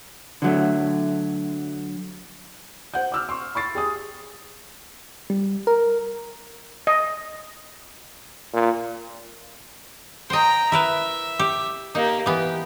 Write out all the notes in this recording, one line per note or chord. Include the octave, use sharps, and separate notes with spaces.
D3 F#3 A3
C5 F#5 G6
D6 E6 F6
C6 C#6
B5 C#6 A6 C7
G4 G#4 D#6
G3
A#4
D#5
A#2
C5 D#5 G5 A#5
E4 A#4 B4 E5
G4
A#3 D#4 G4
E3 B3 G4